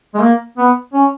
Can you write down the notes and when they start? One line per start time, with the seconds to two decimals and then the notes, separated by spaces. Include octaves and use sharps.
0.14 G#3
0.21 A#3
0.58 B3
0.93 C#4